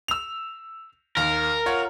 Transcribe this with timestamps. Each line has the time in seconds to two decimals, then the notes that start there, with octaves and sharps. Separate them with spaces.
0.08 E6 F7
1.17 D#2 A#4
1.66 F4 C#5 F#5